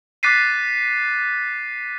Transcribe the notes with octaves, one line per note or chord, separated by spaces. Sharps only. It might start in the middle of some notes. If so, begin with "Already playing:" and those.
D6 F#6 A6 B6 C7 D#7